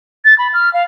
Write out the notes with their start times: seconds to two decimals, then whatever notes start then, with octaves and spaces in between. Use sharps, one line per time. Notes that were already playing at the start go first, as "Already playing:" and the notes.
0.25 A6
0.38 B5
0.54 F6
0.74 F5